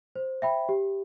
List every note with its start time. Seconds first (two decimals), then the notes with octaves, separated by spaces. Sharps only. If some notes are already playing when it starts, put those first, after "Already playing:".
0.16 C5
0.42 E5 G5 B5
0.69 G4